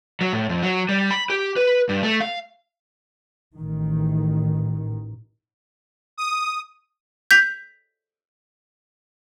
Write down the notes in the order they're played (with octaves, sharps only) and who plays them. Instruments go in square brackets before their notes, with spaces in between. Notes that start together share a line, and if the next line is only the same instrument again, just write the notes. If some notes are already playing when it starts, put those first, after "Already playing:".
[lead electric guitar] F#3
A2
F2
F#3
G3
B5
G4
B4
G2
A3
F5
[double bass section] A1 D#3
[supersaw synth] D#6
[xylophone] G6 B6 F7